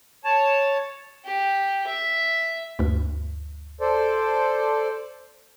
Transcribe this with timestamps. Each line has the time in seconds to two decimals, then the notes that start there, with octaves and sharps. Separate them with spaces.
0.24 C#5 A5
1.25 G4
1.87 E5
2.79 D2 G2
3.81 A4 C5 D5